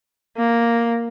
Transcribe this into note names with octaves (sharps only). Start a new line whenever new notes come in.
A#3